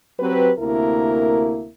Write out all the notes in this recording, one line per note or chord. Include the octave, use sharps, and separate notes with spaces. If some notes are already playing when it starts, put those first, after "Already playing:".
F#3 C4 G4 B4
D2 C3 A#3 E4 A#4